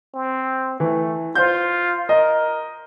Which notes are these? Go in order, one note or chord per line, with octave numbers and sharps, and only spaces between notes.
C4
E3 A3
F4 C5 G6
A#4 D#5